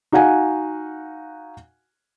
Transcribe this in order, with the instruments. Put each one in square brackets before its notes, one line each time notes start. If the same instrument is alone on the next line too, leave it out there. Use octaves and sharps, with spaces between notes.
[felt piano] D#4 F#4 F5 F#5 G#5